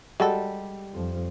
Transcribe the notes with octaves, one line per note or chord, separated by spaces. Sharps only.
G3 G#3 F#4 A4
F2 F3